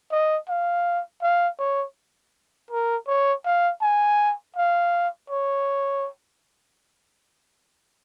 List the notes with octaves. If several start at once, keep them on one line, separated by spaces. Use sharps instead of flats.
D#5
F5
F5
C#5
A#4
C#5
F5
G#5
F5
C#5